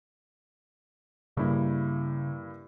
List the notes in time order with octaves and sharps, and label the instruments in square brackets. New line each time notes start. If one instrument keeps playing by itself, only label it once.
[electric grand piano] G2 A#3 E4 [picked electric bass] C#3